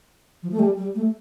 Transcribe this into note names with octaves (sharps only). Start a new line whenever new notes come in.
F3
A3
G3
G3
A3